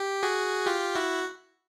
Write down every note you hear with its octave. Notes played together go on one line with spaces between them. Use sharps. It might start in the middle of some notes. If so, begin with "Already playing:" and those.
Already playing: G4
F#4 G#4
F4 G4
E4 F#4